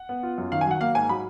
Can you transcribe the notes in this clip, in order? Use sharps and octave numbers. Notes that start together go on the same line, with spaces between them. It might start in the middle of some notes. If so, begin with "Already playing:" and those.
Already playing: F#5
B3
F4
F#2
D#3 F5
G#5
F#3 F#5
A#3 F5
G#2 G#5
F#3 B5